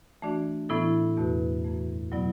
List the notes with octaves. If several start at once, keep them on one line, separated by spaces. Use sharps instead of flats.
E3 A3 D4 F#4 D5
A2 E3 B3 E4 A4
E2 B2 A3 F#4 B4
F#2 E3 A3
B2 F#3 B3 E4 D5